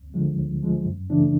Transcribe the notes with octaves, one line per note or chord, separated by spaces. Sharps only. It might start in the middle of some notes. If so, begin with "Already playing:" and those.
Already playing: D2
D3 F3 G#3
D2
D3 F3 G#3
F#2
C#3 E3 A3 D4